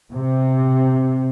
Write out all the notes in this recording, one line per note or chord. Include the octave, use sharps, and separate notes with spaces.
C3